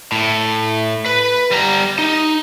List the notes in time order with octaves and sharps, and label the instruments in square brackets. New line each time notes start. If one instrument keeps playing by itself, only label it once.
[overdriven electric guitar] A2
B4
G3 A#5
D#4